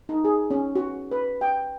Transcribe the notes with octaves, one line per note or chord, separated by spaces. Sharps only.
D#4
G#4
C#4
F#4
B4
G5